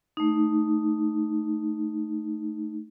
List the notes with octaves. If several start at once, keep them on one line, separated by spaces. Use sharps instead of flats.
A3 D#4